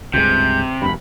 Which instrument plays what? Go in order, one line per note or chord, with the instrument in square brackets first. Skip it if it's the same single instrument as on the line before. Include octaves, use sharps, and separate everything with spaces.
[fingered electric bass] C#2 G2 G#3 [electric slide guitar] C3 [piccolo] G6
[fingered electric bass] E1 G2 [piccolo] B5